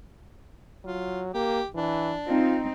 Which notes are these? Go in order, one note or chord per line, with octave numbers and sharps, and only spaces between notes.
F#3 F4
A#3 G4
E3 D4
C4 D#4 F4